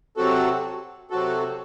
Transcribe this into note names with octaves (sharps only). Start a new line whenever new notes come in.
C3 F#3 C4 F#4 A4
C3 F#3 C4 F#4 A4